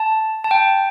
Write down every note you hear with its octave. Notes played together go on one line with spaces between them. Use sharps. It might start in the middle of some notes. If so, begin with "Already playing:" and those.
Already playing: A5
A5
G5